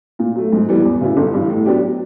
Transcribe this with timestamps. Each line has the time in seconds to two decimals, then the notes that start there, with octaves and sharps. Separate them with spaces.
0.19 A#2
0.35 F#3 A3
0.52 G#2
0.69 E3 G3 B3
0.85 E2
1.01 C#3 F#3 B3 E4
1.17 G1
1.33 G2 E3
1.50 A2
1.65 F#3 B3 D4 G4